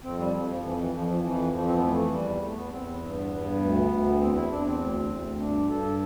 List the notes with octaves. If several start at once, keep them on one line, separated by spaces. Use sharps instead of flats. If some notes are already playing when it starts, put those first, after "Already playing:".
F2 C4
G3
F2 F3
F3
F2 E3
E3
F2 F3
F3
F2 E3
F2 F3
C4
B3
E3 A3
E2 G3
E2 A3
B3
E2 C4
B3
G2
G2
D2
D2
E2 C4
E4
E2 D4
C4
D2
D2
G2 D4
G2 A4